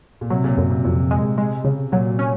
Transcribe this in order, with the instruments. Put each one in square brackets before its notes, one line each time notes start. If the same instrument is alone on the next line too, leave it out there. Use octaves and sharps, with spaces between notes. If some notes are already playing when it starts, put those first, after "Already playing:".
[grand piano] A#2
[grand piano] C3 [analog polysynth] F#3
[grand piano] A#2
[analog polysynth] F#2 [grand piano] A#2
[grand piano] C3
[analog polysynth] F2 [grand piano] C3
[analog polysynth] G#3
G#3
C#3
[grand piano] A#2 [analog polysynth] F#3
[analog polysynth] C#4